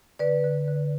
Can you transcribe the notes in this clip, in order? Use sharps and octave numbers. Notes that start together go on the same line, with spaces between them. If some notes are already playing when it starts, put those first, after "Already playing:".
D3 B4 D5
D3
D3